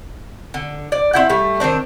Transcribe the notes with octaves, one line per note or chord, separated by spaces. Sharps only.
D3
D5
C4 E4 F#5
G3 A3
D#3 E3 C4 D4